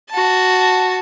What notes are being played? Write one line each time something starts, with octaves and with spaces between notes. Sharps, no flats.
F#4 A5